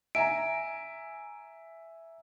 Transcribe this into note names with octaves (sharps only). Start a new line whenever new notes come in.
E5 G#5 A#5 D7